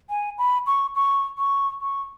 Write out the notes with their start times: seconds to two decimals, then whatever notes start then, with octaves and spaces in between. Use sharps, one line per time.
0.10 G#5
0.38 B5
0.67 C#6
0.95 C#6
1.38 C#6
1.82 C#6